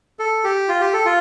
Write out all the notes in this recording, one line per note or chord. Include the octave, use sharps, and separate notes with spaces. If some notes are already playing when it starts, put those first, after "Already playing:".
A4
G4
F4
G4
A4
F4